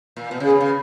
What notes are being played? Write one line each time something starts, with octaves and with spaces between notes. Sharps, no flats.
A#2
B2
C#3
G#4
B2
C#3